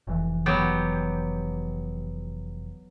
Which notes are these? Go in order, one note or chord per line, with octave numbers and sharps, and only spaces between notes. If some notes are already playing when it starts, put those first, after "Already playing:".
F1 E3
F#3 B3 G4